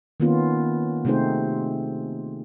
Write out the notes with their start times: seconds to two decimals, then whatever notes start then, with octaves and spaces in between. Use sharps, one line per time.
0.20 D#3 A#3 B3 C#4 F4
1.05 C3 A3 C4 D#4 G#4 C5